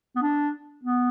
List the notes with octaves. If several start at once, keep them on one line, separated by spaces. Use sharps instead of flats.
B3
D4
B3